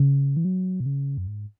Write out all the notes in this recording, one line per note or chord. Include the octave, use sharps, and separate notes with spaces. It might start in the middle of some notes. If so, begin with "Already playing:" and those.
Already playing: C#3
E3
F#3
B2
C#3
F#2
G#2